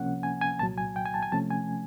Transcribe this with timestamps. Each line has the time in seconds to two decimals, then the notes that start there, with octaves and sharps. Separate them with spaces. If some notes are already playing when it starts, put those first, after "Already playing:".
Already playing: C#2 C3 F3 A#3 C#4 F#5
0.23 G#5
0.41 G#5
0.59 C2 A#2 F#3 A5
0.78 G#5
0.96 G5
1.06 G#5
1.14 A5
1.23 G#5
1.32 C3 F3 A3 C#4 A5
1.50 G#5